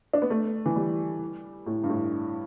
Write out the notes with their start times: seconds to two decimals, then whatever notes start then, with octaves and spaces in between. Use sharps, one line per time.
0.13 D4
0.22 B3
0.30 A3
0.66 E3
0.76 G3
1.66 A2
1.84 G2
1.89 A2